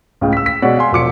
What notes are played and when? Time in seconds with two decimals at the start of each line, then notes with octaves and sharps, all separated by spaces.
0.21 C#2 A2 C#3 G#3 G5
0.33 E6 B6
0.46 B6
0.62 B2 G#3 C#5 D5 F#5
0.77 F5 G#5 C6
0.92 E1 F3 D6 C#7